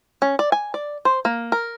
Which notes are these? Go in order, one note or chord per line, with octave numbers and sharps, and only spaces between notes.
C#4
D5
G#5
D5
C5
A#3
A#4